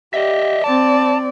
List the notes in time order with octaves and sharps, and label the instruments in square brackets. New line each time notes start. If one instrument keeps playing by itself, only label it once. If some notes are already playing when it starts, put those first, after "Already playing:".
[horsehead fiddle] G4 [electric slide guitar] D#5 E5
[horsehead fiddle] C4 D5 [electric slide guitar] A5